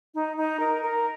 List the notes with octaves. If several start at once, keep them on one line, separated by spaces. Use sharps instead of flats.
D#4
D#4
A#4
A#4